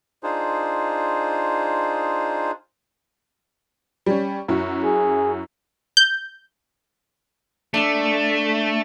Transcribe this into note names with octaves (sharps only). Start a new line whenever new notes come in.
D4 D#4 F4 G#4 C5
G3 C#4
F#2 E4 F#4
G#4
G6
A3 D4 E5